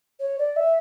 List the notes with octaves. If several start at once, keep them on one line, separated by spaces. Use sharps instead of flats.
C#5
D5
E5